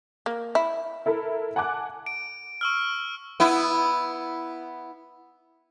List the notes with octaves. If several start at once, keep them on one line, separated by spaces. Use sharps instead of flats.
A#3
E4
E4 A4 A#4 B5
F#5 G#5 A5 D6 F#6
D7
C#6 E6 F6
B3 E4